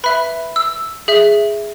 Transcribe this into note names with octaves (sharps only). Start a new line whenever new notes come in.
B4 E5 B5
E6
G#4 E5